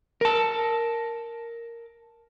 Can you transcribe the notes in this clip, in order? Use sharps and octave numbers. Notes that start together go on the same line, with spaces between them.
A#4 A5